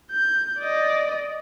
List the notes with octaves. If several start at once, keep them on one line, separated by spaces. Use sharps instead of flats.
G6
D5 D#5